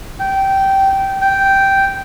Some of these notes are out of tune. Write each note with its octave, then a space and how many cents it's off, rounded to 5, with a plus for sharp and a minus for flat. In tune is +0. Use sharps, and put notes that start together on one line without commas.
G5 -15
G5 -5